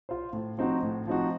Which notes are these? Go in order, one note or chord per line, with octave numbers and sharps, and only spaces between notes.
F4 C5
A2
F3 C4 D#4 F#4
A2
F3 C4 D#4 F#4